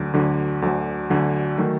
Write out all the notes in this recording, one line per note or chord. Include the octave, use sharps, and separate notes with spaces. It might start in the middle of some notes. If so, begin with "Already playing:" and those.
Already playing: D2 D3 F#3
D2 D3 F#3
D2 D3 F#3
D2 D3 F#3
D#3 F#3 A3